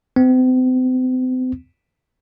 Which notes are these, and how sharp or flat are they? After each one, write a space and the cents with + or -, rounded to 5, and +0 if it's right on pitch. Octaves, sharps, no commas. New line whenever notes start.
C4 -40